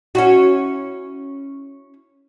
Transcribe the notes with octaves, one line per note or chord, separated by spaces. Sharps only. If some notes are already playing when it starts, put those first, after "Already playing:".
C#4 E4 F#4